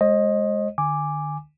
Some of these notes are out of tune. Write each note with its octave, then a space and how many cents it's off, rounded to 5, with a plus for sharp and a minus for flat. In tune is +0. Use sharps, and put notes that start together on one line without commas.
G#3 +0 C5 +40 D#5 +0
D3 +40 G#5 -5 D6 +0